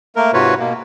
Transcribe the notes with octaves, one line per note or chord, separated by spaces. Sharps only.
A3 A#3 A#4
G#2 C3 F4 F#4 B4 C#5
B2 A#3